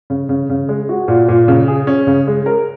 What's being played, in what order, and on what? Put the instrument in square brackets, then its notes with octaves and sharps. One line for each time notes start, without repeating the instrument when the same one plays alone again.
[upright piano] C#3
C#3
C#3
G#3
F#4
A#2
A#2
C#3
G#4
C#4
C#3
G#3
A#4